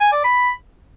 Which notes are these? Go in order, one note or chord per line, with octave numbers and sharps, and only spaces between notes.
G#5
D5
B5